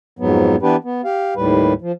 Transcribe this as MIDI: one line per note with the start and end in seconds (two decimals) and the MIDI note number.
0.19 0.56 41
0.19 0.56 44
0.19 0.56 54
0.19 0.56 59
0.62 0.76 52
0.62 0.76 59
0.62 0.76 62
0.62 0.76 67
0.62 0.76 71
0.84 1.01 59
1.04 1.34 67
1.04 1.34 77
1.36 1.73 39
1.36 1.73 45
1.36 1.73 55
1.36 1.73 71
1.82 1.92 53